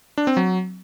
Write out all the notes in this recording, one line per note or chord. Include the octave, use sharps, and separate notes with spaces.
D4
C4
F#3